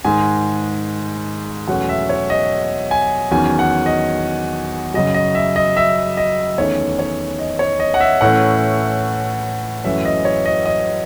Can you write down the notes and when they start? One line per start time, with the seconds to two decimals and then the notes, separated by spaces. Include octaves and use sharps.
0.05 G#2 D#3 G#3 G#5
1.68 E2 B2 F#3 A3 C#4 F#5
1.89 E5
2.10 C#5
2.30 D#5
2.91 G#5
3.31 E2 D#3 F#3 C#4 G#5
3.59 F#5
3.86 D#5
4.94 F#2 C#3 F#3 D#5
5.14 D#5
5.35 E5
5.56 D#5
5.77 E5
6.17 D#5
6.58 E2 D#3 A3 C#4 C#5
6.99 C#5
7.39 D#5
7.59 C#5
7.80 D#5
7.94 F#5
8.00 E5
8.21 A2 E3 A3 C#4 F#5
9.84 F#2 E3 A3 C#4 E5
10.05 D#5
10.25 C#5
10.46 D#5
10.66 D#5